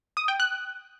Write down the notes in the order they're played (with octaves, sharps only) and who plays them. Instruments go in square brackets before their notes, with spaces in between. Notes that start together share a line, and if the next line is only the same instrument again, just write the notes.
[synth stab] D#6
G5
F#6